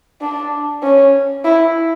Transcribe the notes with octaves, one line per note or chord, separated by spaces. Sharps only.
D4
C#4
E4